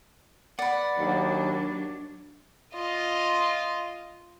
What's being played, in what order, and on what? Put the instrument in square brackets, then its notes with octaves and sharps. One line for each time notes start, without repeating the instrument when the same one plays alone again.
[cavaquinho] B4 D5 [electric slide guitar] F#5
[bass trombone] D#2 [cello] F#3 D4
[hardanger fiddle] F4 D#5